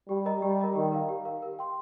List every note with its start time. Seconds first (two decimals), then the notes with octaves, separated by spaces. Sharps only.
0.08 G3 G4
0.25 A#4 D#5 A#5
0.42 G3 G4
0.59 A#4 D#5 A#5
0.76 D#3 G4
0.92 A#4 F5
1.09 G4
1.25 A#4 F5
1.42 A#4
1.59 G5 C6